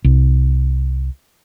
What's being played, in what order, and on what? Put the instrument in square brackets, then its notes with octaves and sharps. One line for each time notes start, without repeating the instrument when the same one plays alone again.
[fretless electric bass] C2